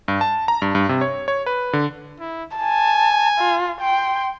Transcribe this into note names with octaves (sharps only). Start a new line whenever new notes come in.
G2
A5
A#5
G2
G2
C3
C#5
C#5
B4
D3
E4
G#5 A5
F4
G5 C6